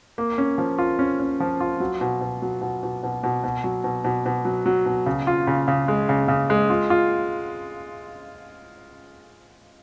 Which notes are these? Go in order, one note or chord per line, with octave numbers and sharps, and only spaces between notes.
A#3
C#4
F3
F4
C#4
C#4
F3
F4
F#3
B2
B2
F#3
B2
B2
B2
B2
B2
F#3
B2
B2
B2
F#3
F#3
B2
C#3
F4
C#3
C#3
G#3
C#3
C#3
G#3
F4
F4